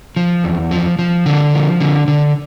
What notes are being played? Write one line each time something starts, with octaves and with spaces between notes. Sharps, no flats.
F3
E2
F3
F3
D3
F3
D3
D3